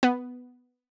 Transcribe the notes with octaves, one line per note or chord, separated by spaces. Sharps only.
B3